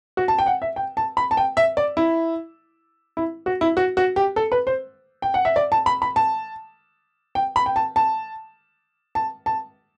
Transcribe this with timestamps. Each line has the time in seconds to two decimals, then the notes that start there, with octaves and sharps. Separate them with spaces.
0.17 F#4
0.28 A5
0.39 G5
0.46 F#5
0.62 E5
0.76 G5
0.97 A5
1.17 B5
1.31 A5
1.37 G5
1.57 E5
1.77 D5
1.97 E4
3.17 E4
3.46 F#4
3.61 E4
3.77 F#4
3.97 F#4
4.16 G4
4.36 A4
4.52 B4
4.67 C5
5.22 G5
5.34 F#5
5.45 E5
5.56 D5
5.72 A5
5.86 B5
6.02 B5
6.16 A5
7.35 G5
7.56 B5
7.66 G5
7.76 A5
7.96 A5
9.15 A5
9.46 A5